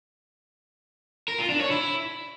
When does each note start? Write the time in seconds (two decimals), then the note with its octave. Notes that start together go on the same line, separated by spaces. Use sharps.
1.29 A#4
1.39 F4
1.50 D4
1.61 C#5
1.71 E4